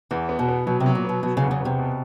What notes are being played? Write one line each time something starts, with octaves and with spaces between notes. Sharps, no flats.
E2 E3
B3
B2
B3
B2 F#3
C3
F#3
A#2
B2 B3
B2 F#3
C#3
E2
C#3
C3 B3
B2